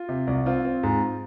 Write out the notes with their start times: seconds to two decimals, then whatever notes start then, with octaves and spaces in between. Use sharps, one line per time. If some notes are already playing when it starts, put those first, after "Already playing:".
Already playing: F4
0.09 C3
0.27 C2
0.46 C4 F4
0.65 C4
0.83 G#2